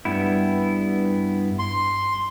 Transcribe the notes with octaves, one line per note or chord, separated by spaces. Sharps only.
G2 B3 E4
C6